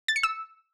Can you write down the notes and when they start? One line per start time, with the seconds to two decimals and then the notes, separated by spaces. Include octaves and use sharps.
0.08 A6
0.16 C#7
0.23 E6